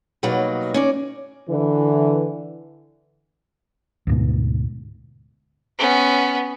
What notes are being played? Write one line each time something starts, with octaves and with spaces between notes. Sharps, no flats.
B2 F#3 G3 A#3 D#4 B4
C#4 D#4 D5
D3 E3
D2 G#2 B2
B3 C#4